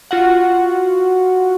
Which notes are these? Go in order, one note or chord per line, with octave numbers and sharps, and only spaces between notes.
F4 F#4 F#5